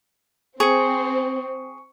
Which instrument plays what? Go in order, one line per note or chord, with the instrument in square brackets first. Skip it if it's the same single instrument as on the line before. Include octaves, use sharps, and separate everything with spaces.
[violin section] C4 [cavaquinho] G#4 [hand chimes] C#6 C#7